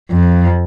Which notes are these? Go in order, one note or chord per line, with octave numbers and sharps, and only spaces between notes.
F2